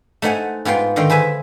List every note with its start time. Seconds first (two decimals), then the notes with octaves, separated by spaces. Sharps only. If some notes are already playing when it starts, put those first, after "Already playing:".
0.22 A3 D#4 C5 F#5 G#5
0.65 G#2 B3 F4 G5 C6
0.96 D3 D#3 G5 C6
1.10 G#4 B4 C5 E5 G#5